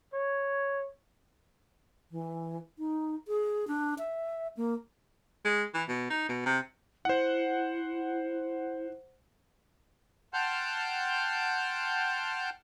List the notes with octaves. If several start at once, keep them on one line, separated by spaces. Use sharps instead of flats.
C#5
E3
D#4
G#4
D4
E5
A#3
G#3
E3
B2
D#4
B2
C3
E4 C5 F#5
F#5 G5 A5 C6 F6 G6